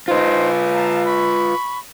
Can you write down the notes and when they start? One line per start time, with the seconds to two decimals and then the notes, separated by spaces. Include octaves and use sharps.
0.08 D#4 F4 B4 C5
0.71 F5 A5 A#5
1.05 B5 C#6